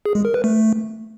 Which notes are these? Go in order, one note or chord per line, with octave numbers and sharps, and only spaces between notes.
G#4
G#3
A#4
B4
A3